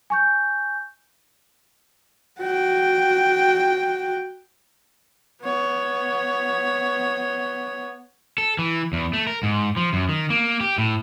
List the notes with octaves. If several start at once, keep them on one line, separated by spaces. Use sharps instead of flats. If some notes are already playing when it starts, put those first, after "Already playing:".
G#5 C#6 G6
F#4 G5
B3 C#5
A4
E3
E2
A3
A#4
G#2
F3
F#2
D#3
A#3
G4
A2